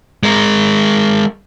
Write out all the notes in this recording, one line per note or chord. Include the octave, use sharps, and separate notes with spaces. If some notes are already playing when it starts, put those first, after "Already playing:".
G#3 A#4